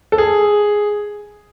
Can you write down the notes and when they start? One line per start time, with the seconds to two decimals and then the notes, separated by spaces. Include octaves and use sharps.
0.12 A4
0.18 G#4